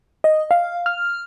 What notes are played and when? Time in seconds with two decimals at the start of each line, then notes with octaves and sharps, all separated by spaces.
0.24 D#5
0.51 F5
0.86 F6